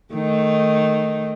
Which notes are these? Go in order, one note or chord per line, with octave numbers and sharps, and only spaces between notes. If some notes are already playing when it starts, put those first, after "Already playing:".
D#3 A3 D#4